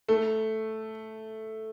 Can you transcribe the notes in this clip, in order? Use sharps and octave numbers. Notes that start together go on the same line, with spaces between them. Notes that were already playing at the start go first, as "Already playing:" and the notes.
A3